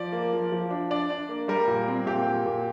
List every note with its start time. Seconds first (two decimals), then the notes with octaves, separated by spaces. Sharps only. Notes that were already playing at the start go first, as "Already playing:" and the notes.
Already playing: F3 D5
0.12 A#3
0.33 F3
0.52 F3
0.70 D4
0.91 D4 D5
1.10 D4
1.29 A#3
1.48 G3 A#4
1.67 A#2
1.88 C4
2.06 A#2 G4
2.26 A#2
2.46 A#2